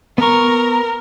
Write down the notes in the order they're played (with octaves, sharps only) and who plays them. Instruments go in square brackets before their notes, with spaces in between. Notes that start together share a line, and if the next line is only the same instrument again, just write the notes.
[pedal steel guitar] B3 C#6 [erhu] A#4